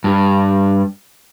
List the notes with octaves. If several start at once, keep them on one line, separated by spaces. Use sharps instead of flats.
G2